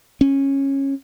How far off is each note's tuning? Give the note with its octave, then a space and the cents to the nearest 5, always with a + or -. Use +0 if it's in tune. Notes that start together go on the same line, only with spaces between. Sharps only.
C#4 -15